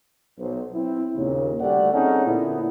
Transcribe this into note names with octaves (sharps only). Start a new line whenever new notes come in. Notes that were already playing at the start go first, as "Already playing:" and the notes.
B1 C5
C4 E4
D#2 A#2 C#3
D2 G3 A3 G4 D5 F#5
C4 C#4 D#4 G#4 A4 F#5
A#2 D3 B3 E4